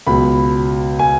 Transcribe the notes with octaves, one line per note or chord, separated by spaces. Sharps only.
C#2 B2 F#3 B5
G#5